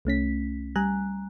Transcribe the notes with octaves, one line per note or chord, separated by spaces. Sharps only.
C2 A3 C#4 B6
G3 G#5 A#5 F#6